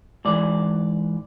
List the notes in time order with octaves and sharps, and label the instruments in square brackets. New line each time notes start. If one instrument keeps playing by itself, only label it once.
[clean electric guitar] G#2 E3 D5